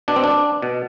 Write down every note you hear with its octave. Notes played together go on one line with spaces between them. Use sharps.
B2 D4
C4
D4
B2